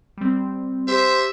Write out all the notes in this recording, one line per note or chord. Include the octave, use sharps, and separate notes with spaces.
G3 C4
G4 C5 E5 D6 C7